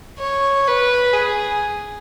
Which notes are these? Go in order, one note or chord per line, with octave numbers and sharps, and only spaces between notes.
C#5
B4
G#4